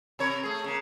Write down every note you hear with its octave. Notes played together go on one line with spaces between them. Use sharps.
C3 A#4 C#5
A3 G#4
C#3 A#3